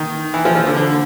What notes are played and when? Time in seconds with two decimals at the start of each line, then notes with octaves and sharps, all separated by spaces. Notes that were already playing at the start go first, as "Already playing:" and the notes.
Already playing: D#3
0.34 E3
0.45 F3
0.55 F3
0.66 D3
0.76 D3